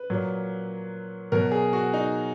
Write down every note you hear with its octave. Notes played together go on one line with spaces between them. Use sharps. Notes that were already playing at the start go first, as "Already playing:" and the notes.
Already playing: B4
A#2 F#3
B2 F#3 A#4
G#4
F#4
D#4